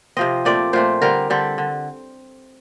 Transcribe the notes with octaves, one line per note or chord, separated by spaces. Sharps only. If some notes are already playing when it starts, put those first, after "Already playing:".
C3 F3 C4 D#5
A#2 A3 C4 D5
A#2 A3 C4 C5
D3 G3 C4 A#4
D3 G3 C4 A4
D3